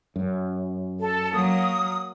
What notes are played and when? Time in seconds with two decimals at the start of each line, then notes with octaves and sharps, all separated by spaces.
0.16 F#2
0.99 A4
1.33 F#3 A#3 D#6